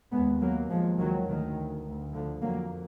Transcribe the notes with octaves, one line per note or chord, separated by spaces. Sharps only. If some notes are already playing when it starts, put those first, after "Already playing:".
D#2 G#3 B3
F#3 A#3
D#2 F3 G#3
D#3 F#3
D2 D#3
D2
D3 F3
F2 F#3 A#3